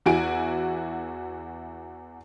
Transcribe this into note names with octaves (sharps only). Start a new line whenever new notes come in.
E2 E4 F#4 G#5 D7